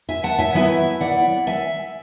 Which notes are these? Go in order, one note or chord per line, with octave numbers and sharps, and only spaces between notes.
E5 G#5
F#5 A5
E5 G#5
F#3 B3 E4 E5 G#5
D5 F#5
E5 G#5